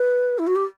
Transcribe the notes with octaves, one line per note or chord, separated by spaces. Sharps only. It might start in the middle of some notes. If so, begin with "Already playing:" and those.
Already playing: B4
E4
F#4
G4